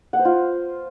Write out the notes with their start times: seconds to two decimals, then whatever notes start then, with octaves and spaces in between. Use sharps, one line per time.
0.13 F#5
0.19 C5
0.25 F4